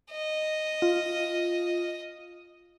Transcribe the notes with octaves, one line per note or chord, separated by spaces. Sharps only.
D#5
F4